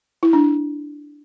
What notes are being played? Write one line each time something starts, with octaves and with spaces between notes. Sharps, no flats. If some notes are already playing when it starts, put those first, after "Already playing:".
E4
D4